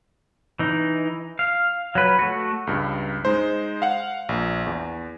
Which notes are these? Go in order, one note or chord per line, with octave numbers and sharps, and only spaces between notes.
E3 D#4
F5
F#3 B4
A3 F#4
C#2 G2
G#3 D#4 C5
F5 F#5
A#1 A#2
E2